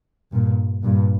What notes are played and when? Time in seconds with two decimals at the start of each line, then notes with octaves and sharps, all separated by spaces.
0.33 G2 A#2
0.83 G2 A#2